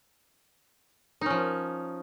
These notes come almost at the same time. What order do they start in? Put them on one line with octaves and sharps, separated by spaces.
D#4 C#4 F3